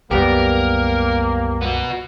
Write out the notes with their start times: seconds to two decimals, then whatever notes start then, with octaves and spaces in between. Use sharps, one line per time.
0.11 C2 F#2 G3 A#3 B3 G4 A#4
1.62 B3 F#4